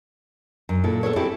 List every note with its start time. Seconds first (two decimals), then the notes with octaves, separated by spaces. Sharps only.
0.69 F#2
0.84 A#2 E4 A4
1.03 B3 A4 B4 C#5
1.16 C4 C#4 E4 G4 A4